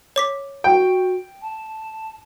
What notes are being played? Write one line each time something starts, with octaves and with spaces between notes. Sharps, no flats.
C#5 D6 B6
F#4 G5
A5